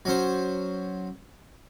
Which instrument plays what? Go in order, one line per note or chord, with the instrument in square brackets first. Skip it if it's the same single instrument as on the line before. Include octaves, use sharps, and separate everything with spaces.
[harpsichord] F#3 C#4 C5